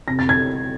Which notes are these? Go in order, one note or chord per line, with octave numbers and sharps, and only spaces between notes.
C3 A#6
A6
G#6